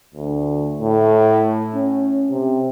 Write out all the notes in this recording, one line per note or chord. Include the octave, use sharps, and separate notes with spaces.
D2
A2
C#4
C3